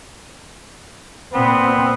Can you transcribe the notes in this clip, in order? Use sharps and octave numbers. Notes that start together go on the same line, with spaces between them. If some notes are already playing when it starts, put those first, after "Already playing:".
A#2 B3 C4